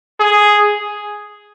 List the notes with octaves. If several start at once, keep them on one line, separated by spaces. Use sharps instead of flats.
G#4